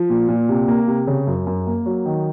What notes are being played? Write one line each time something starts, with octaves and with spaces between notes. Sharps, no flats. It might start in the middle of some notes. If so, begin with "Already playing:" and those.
Already playing: F3
A#2
A#2
C3
A#3
C3
C#3
F#2
F#2
A#3
F#3
D#3